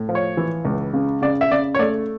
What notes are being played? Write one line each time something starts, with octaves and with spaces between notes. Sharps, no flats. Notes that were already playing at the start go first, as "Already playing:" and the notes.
Already playing: A2
F3
C#5
E3
C#2
C#3
C#3 D5
E5
C#3 D5
C#5
A3 D5